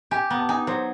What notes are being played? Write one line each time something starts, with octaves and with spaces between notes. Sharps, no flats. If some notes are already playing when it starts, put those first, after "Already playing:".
G4 G#5
B3 A#5
A5
D#4 G#5
F#3 C5